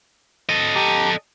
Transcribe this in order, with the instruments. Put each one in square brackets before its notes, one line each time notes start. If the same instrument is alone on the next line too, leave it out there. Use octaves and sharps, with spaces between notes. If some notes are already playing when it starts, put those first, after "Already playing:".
[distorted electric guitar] A4 D#5
[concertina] G4 A5 A#5